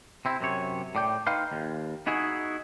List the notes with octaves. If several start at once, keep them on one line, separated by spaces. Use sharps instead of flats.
C3 C4 E4
F#2 C3 C#5
A2 D5 G5
D#4 B4 F5 G5 C6
D#2
B3 D#4 E4 F#4 G#4